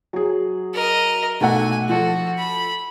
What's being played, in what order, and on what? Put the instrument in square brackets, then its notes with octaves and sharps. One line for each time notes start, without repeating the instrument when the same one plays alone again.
[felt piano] F#3 G#4
[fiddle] A#4 D#5
[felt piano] B1 A3 F#5 [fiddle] G#5
[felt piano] F3 A4 [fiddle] F#4
[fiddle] B5